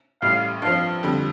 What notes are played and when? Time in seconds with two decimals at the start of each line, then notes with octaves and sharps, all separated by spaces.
0.22 A1 A2 G3 F5
0.62 G2 F3 C4 F5
1.03 F2 D3 G3